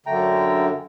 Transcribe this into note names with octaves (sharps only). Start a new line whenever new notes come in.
F#2 D3 A3 G5 A#5